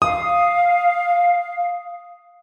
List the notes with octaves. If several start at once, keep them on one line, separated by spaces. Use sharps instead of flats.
F5 D#6